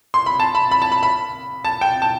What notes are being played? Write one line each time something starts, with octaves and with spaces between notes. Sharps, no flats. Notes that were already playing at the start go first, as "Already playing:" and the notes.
C6
B5
A5
B5
B5
A5
B5
B5
A5
G5
A5